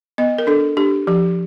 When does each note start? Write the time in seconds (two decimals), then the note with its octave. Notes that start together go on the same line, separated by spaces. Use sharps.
0.18 B3 D#5
0.38 A#4
0.47 D4 A4
0.77 D4 G4
1.07 F3 G4